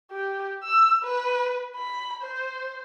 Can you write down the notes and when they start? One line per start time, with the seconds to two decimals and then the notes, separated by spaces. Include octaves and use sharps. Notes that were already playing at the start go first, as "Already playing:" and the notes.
0.11 G4
0.64 E6
1.03 B4
1.76 B5
2.22 C5